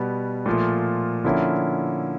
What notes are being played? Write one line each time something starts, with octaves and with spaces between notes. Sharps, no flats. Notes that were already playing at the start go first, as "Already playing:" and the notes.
Already playing: B2 G3 B3
A#2 F3 A3
D3 F3 A#3 C#4 E4